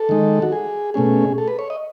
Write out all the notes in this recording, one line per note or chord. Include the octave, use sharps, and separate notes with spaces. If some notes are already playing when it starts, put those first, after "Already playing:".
Already playing: A4
D#3 G#3 D#4
F#4
G#4
B2 A3 C#4 G#4
A4
B4
C#5
D#5